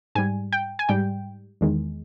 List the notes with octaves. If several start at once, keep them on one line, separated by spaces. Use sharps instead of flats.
G#2 G3 G#5
G5
G#5
G#2 G3 G5
E2 D#3 G#3